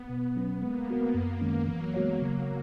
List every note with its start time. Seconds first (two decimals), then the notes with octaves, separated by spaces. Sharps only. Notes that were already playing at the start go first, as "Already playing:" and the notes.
Already playing: B3
0.09 B2
0.36 F#3 C#4
0.62 G#3 A#3
0.89 B3 F#4 A#4
1.14 F#2
1.41 D#3 G#3 C#4
1.68 E3 F#3
1.94 G#3 B3 F#4 C#5
2.21 C#3